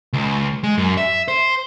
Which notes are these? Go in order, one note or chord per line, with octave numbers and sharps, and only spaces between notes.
C#2
G#3
F#2
E5
C5